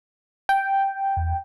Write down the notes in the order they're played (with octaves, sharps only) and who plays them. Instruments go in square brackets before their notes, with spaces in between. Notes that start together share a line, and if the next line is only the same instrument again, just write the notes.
[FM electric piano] G5
[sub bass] E2